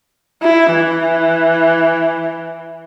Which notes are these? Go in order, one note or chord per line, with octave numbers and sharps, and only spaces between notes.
E4
E3